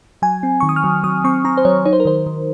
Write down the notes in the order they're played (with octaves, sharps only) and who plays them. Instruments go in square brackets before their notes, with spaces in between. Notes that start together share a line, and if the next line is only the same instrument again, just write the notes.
[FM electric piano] F#3 G#5
C4
D#3 C#6
D#6
F6
F#3
F#3 D#6
C4 C#6
C4 A#5
C5
F#3 C#5
D#4 C#5
C5
A#4
D#3 C5
D#3